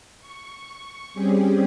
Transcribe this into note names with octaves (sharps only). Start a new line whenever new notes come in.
C#6
G3 C4 C#4 G4 G#4